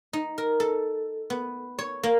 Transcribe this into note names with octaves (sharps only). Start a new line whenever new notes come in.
D#4
A#4
A4
B3
C#5
A#3